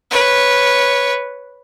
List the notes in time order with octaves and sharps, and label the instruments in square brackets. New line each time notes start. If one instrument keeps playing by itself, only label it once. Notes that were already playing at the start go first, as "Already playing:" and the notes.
[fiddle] B4 C#5